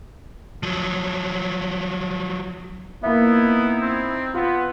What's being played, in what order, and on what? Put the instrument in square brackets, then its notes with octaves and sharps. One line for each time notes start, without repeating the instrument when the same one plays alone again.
[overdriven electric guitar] F3 F#3
[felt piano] A#3 E5 [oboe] B3 [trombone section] D#4 E4
[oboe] C4
[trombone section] B3 [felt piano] F4